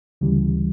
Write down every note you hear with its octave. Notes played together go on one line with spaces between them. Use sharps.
D2 C#3 E3 G3